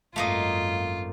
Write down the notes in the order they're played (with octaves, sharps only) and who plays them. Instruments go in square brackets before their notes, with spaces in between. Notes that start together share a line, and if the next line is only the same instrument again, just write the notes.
[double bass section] G#1 F#2 [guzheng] A3 A#3 D#5 [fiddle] F4